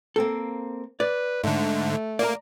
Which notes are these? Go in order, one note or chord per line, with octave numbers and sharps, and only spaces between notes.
A#3 C4 A4
B4 D5
G#2 D3 A3
A#3 D5 A#5